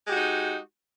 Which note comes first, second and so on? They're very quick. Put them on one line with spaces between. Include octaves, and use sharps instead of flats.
G#3 G4 F#4 D#4